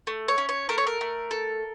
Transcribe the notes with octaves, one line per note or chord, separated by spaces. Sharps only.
A3
C#5
C#4
C#5
A3 A#4
C#5
A#4
A3
A4